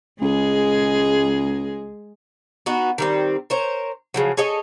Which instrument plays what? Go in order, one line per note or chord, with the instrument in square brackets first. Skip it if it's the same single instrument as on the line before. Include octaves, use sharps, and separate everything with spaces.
[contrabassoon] C#2 [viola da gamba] G#3 G#4
[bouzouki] B3 D#4 F#4
D#3 G3 C4
A#4 C5 C#5
C#3 F3 F#3
G#4 A4 C#5 D#5